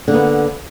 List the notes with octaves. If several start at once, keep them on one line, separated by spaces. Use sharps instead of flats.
D3 A#3 B3